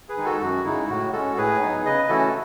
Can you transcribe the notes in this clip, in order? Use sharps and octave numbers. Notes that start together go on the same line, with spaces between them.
G#4 B4
D#3 G#3 D#4
F#4 A4
F#2 F#4
C#3 G#3 D#4 E4
A2 F#4
G#3 C#4 F#4 A4
A2 G#4 B4
F#3 B3 D#4
C#3 B4 D#5
E3 A3 C#4 E4 F#4 A4